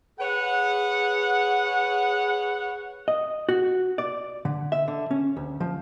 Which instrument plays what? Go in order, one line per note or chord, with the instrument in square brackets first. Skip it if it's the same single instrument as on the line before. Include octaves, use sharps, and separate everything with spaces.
[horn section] G#4 B4 C#5 F#5
[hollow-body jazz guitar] D#5
F#4
D5
D3
E5
D3
C#4
D2
F3